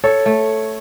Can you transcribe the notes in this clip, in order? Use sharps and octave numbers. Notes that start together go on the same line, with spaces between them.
A4 C#5
A3